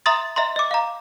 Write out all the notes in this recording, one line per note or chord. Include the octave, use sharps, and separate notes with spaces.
E5 A#5 C6 D#6 A6
D#5 E5 A#5 C6
D#5 D6
F5 A#5